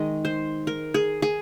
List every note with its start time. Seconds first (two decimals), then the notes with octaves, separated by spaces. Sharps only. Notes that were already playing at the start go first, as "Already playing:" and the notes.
Already playing: D#3 G#3 D#5
0.25 C5
0.67 A#4
0.94 G#4
1.22 G#4